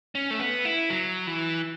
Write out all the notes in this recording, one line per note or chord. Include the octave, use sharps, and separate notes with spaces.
C#4
A3
B3
E4
F#3
E3